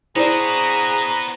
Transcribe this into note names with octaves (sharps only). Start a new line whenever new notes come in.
B3 D4 E4 F#4 G#4 C5 A#5